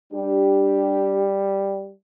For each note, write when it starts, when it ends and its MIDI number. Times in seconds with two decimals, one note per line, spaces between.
0.13 1.93 55
0.13 1.29 62
0.13 1.29 67